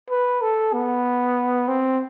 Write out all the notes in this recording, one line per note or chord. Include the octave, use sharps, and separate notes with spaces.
B4
A4
B3
C4